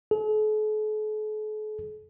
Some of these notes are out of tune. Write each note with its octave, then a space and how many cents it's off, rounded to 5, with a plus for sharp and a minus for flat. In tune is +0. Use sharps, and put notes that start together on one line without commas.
A4 -45